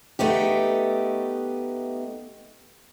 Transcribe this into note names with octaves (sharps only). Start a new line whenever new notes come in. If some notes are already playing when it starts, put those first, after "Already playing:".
A3 B3 D#4 G4